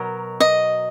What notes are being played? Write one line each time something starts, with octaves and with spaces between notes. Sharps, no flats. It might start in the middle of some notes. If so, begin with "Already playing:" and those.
Already playing: B2 F#3 A#4
D#5